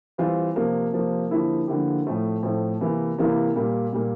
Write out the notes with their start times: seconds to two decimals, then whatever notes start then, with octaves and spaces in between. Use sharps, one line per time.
0.18 E3 G3 C4 F4 C5
0.55 C3 F3 A#3
0.93 C3 F3 A#3
1.30 D3 F3 A#3 E4 G4
1.67 D3 F3 A#3 E4 G4
2.05 A2 F3 A3 C4
2.43 A2 F3 A3 C4
2.81 C3 E3 A#3 E4
3.18 C3 E3 A#3 E4
3.56 A#2 G3 A#3
3.93 A#2 G3 A#3